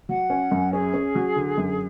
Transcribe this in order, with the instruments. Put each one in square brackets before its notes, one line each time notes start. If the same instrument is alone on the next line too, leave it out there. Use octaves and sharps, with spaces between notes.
[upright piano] F#3 [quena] F#5
[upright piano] C#4
F#2
[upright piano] C#4 [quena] G#4
[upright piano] C#4
F#3
D3
F#2